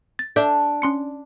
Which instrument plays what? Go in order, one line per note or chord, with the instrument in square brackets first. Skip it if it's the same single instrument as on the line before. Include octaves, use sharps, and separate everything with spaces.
[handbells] A6
[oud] D4 [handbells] A4 E5 G6
[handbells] C#4 C6 C#7